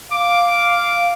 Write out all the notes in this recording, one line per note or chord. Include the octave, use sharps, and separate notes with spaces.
F5 D6